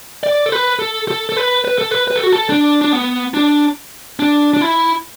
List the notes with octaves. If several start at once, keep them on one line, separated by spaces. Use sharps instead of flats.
D5
A4
B4
A4
A4
A4
B4
B4
A4
B4
B4
A4
F#4
A4
D4
D4
B3
D4
D4
D4
E4